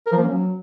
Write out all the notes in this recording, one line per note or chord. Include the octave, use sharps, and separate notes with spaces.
A#4
F3
A#3
C#4
F#3